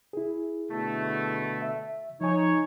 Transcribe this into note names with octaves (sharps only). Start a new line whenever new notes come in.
E4 G#4
B2 D3 A3
E5
F3 D#4 C#5 G#5